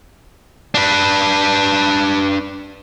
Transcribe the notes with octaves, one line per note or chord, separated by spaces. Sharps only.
D4 B4